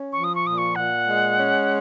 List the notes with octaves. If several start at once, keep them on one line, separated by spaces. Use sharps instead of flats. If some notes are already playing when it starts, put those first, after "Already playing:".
Already playing: C#4
F3 C#6
D#6
C#6
A#2 D#6
C#6
A#2 F#5
G#3
C#4